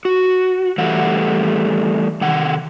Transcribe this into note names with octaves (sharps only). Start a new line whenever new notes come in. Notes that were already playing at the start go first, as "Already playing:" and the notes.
F#4
E3 G3 A3 F#5
C3 D#3 F#5